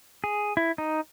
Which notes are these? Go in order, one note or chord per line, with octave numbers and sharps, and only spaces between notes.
G#4
E4
D#4